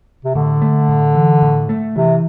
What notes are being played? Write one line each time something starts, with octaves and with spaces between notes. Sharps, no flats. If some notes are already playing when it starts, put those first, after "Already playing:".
C3
A2 D3
A3
A2
E3
A2
A3
C3 E3